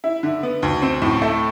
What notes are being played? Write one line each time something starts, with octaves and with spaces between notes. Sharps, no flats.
E4
D3
B3
D2
C4
A2
A3